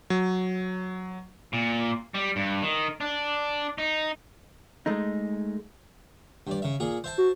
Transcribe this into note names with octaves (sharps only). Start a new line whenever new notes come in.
F#3
A#2
G3
G2
D#3
D4
D#4
G#3 A3 D#4
G2 D5
C#3 E5
A#2 G#4
C5 E5 A5
F#4